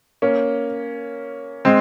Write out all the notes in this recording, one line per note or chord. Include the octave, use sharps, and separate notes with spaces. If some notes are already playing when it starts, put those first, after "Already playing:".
A#3 C#4
G#3 C4